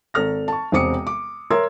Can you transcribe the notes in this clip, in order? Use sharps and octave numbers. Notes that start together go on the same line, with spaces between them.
G#1 A4 F6 A#6
A5 C#6
E1 C3 C4 D6 D#6 C#7
D6
A#4 C#5 E5 C6 E6 G#6